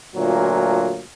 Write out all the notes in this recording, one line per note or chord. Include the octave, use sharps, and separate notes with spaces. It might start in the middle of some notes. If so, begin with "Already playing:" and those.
D2 A#2 F#3 F4